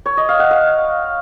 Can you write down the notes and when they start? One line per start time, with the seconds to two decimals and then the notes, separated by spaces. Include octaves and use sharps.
0.06 C#5
0.17 D#5
0.29 F5
0.39 F#5
0.51 F5